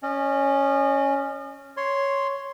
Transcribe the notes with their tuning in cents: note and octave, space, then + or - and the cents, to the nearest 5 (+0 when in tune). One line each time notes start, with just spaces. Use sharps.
C#4 +0 D#5 -40
C#5 +0 C6 +0